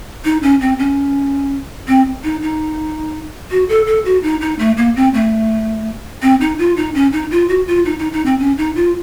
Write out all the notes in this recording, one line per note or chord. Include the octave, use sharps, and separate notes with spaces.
D#4
C#4
C4
C#4
C4
D#4
D#4
F#4
A4
A4
F#4
D#4
D#4
A3
A#3
C4
A3
C4
D#4
F4
D#4
C#4
D#4
F4
F#4
F4
D#4
D#4
D#4
C4
C#4
D#4
F4